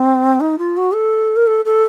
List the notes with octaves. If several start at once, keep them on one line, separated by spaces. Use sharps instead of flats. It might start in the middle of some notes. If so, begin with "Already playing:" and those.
Already playing: C4
D#4
F4
F#4
A4
A#4
A4
A4